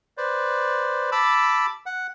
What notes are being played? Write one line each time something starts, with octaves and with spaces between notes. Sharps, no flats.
B4 C5 D5
A5 B5 D6 E6
F#5